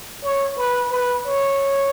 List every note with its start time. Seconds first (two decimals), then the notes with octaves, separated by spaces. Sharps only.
0.24 C#5
0.58 B4
0.92 B4
1.26 C#5